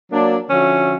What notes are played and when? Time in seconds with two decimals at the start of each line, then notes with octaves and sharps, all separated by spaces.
0.12 F#3 A#3 D4
0.50 D3 F3 C#4 F#4 E5